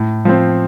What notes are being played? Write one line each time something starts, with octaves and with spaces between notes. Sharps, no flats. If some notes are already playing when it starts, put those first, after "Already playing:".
Already playing: A2
F3 C4